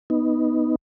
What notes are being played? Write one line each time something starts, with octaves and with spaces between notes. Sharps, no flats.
B3 D#4